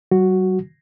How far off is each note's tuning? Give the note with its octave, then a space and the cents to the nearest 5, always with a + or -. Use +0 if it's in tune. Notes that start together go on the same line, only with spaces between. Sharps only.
F#3 +45 F#4 +0